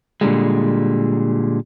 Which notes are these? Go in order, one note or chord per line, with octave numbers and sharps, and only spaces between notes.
A#2 D3 G3 G#3